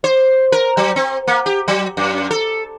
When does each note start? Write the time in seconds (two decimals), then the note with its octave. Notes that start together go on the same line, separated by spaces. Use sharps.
0.04 C5
0.52 A#4
0.77 F#3
0.96 C4
1.27 A#3
1.46 G4
1.68 F#3
1.97 F#2
2.31 A4